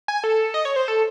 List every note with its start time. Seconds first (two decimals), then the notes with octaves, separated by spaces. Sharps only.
0.08 G#5
0.24 A4
0.54 D#5
0.65 C#5
0.76 C5
0.88 A4